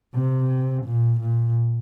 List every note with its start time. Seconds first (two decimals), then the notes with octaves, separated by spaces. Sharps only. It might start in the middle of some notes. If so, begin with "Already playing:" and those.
0.15 C3
0.86 A#2
1.21 A#2